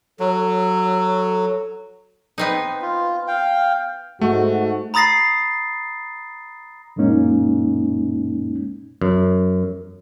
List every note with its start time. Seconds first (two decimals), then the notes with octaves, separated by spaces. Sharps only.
0.20 F#3 A4
2.38 B3 C4 D#4
2.82 F4
3.28 F5 G5
4.21 G#2 A3 F#4
4.94 A#5 B5 D#6 A6 A#6 C7
6.96 F#2 A#2 G#3 A#3 C#4 D#4
9.02 F#2